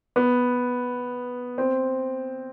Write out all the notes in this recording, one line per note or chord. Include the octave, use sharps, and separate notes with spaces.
B3
C4